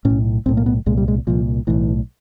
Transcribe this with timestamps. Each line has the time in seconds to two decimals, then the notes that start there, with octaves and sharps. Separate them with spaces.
0.05 B1 A2 C#4
0.46 B1 C4
0.49 A2
0.57 A#3
0.66 B3
0.86 C2 A#2 G#3
0.97 G3
1.08 G#3
1.27 C2 A#2 F3
1.67 B1 A2 E3